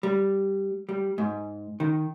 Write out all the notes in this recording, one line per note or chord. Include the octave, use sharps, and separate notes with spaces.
G3
G3
G#2
D#3